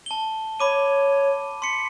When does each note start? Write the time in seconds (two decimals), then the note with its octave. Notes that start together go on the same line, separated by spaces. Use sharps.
0.06 A5 G7
0.60 C#5 B5 D6 D#7
1.62 C6 B6 C#7